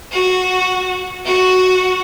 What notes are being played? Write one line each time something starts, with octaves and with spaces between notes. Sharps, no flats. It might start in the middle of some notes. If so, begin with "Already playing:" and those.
F#4
F#4